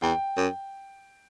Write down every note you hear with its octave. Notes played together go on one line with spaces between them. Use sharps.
E2 G5
F#2